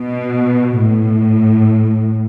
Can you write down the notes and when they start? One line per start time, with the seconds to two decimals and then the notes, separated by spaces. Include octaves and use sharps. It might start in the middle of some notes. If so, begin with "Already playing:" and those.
Already playing: B2
0.79 A2